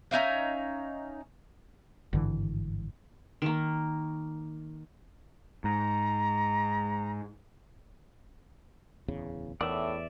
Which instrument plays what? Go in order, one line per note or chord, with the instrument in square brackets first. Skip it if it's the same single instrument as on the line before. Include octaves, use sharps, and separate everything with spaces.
[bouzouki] C#4 D#4 E5 F5
[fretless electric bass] G#1 G2 D3 E3
[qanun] D#3 A#3
[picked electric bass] G#2 [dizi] A#5
[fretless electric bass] D1 E2 C#3
[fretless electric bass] E2 E3 [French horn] A2 [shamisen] D#3 A3 B3 [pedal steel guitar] D5 E5